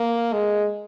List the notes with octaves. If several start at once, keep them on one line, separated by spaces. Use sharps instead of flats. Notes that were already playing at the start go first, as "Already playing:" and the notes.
Already playing: A#3
G#3